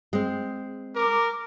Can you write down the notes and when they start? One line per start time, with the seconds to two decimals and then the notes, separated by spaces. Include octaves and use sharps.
0.13 G#3 C4
0.95 A#4 D6